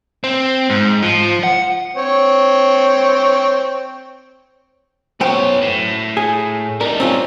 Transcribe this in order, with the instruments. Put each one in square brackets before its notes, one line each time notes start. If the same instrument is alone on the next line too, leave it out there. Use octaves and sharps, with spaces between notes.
[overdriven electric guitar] C4
G#2
F3
F#5
[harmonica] C4 C#5
[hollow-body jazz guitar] F#2 C5 G5 [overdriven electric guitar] B3 C#5
[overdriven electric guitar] A2
[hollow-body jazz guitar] G#4
[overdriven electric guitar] G3 D#4 [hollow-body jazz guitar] A#4
[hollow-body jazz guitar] C4 C#4 F4